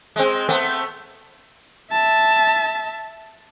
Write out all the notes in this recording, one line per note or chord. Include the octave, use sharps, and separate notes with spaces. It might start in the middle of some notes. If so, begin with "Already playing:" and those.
G#3 C4
A3 B3 C4
E5 A5